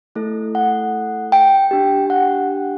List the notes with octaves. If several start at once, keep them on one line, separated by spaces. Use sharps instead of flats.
A3 E4 A4
F#5
G5
D4 G4
F#5